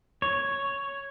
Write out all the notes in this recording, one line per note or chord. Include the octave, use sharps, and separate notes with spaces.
C#5